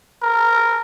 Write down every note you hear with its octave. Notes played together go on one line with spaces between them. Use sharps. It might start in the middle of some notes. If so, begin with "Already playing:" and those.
A#4